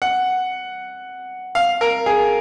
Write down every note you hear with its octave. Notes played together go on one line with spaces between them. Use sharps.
F#5
F5
A#4
G#4